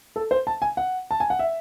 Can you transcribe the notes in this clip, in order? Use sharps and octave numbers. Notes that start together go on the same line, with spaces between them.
A4
C5
A5
G#5
F#5
A5
G#5
F#5
E5